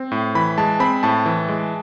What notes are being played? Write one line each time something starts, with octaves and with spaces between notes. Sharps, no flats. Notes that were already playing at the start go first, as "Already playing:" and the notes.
Already playing: C4
A2
E3 B5
G#3 A5
C4 B5
A2 A5
E3
G#3